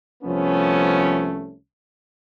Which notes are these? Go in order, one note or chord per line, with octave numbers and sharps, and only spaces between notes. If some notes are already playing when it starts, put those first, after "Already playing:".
C2 F3 A3 B3 C#4